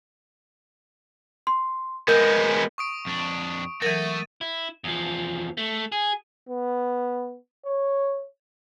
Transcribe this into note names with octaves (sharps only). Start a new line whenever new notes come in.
C6
G#3 B3 A#4 G6
C#6 D#6 D7
F2 D4
E3 F#3 A3 A#4 A6 D#7
E4
E2 F3
A3
G#4
B3
C#5